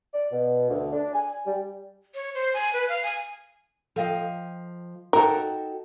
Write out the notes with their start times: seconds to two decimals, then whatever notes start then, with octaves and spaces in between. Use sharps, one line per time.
0.14 D5
0.32 B2
0.69 D2
0.93 D4
1.14 G#5
1.47 G3
2.15 C#5
2.34 C5
2.54 G#5
2.73 B4
2.89 F5
3.03 G#5
3.96 F3 A4 D#5 F5 G5
5.13 D#4 F#4 A4 A#4 D#5 G5